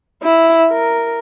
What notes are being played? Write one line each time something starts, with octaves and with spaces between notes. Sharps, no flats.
E4
A#4